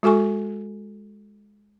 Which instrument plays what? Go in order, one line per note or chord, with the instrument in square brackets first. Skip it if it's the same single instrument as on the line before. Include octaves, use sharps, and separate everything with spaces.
[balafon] G#3 F#4 A4 G#5 C#6